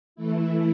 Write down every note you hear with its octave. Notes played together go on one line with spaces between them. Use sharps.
E3 A3 E4